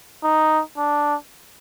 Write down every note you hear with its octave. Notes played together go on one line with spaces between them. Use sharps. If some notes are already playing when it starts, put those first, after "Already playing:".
D#4
D4